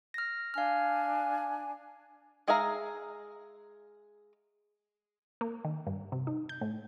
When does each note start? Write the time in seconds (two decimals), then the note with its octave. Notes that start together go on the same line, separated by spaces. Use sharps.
0.14 F6 A#6
0.54 D4 F5 G#5 F6
2.48 G#3 G#4 E5 F5 A#5
5.41 A#3
5.65 D#3
5.87 G2
6.12 C3
6.27 D#4
6.49 G6
6.61 A2